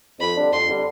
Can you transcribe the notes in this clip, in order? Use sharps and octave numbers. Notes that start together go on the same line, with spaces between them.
F2 B5
D3 G3 D4
F2 C6
D3 G3 D4